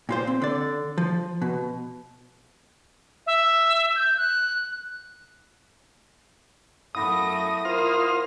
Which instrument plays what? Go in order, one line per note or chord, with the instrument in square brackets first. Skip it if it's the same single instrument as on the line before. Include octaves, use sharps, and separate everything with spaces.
[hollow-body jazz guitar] A#2 F4 C5
C4
D3 D5
F3
B2
[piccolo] E5
G6
F#6
[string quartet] F#2 A3 A#6 [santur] B3 E4 F5 [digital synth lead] D#6
[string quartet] A#3 [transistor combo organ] F4 C5 F6